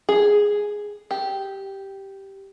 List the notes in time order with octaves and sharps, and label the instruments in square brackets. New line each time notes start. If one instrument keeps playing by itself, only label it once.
[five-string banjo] G#4
G4